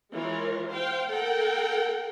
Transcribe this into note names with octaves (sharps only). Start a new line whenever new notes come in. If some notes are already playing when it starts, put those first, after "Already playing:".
E3 G#3 F4 A#4 C#5
C5 F5 G5
A4 A#4 F#5 G5